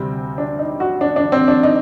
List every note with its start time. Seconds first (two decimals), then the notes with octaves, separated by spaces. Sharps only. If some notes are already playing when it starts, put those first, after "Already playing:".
Already playing: D2 C3 G3 C4
0.38 D4
0.59 D#4
0.80 F#4
1.01 D4
1.16 D4
1.32 C4
1.48 D4
1.63 D#4